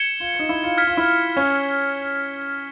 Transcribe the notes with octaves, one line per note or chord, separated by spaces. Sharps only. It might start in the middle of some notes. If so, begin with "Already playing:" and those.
Already playing: G#6 C#7 E7 G7
F4
D#4
E4
F4
F6 G#6 B6
F4
E4
C#4